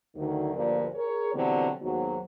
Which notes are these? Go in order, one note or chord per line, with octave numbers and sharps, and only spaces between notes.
D2 D#3 F#3
D2 G2 A#2 F3 A#3 D5
G#4 A#4 C#5
B2 D3 E3 F#3 G3 C4
D#2 G#2 B2 F#3